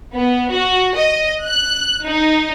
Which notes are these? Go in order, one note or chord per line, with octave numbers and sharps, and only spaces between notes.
B3
F#4
D#5
F#6
D#4